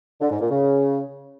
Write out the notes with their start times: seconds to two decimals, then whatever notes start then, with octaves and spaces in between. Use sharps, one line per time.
0.21 D3
0.31 G#2
0.41 A#2
0.50 C#3